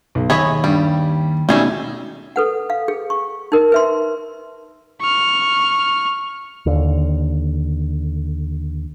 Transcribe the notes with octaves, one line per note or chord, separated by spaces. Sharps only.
B1
D#2 G#4 C#5 D#5 E5 B5
G2 G3
B2 G3 A3 C#4 D#4 G#4 E5
A4 B4 F#5
F5
G#4
C#6
D#4 A#4
B4 E5 C6
C#6 F6
D#2 D3